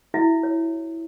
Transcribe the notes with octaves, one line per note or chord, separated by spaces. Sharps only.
E4 F#4 E5
C#5